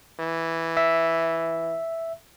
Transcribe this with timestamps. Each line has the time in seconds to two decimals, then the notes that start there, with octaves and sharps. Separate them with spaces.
0.20 E3
0.77 E5